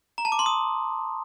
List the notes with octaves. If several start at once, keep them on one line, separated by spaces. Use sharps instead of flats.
A#5
A5
D6
C6
D#6